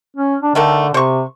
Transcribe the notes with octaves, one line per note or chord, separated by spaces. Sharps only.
C#4
D4
D3 D#3 A3 A#4
C3 C5 C#6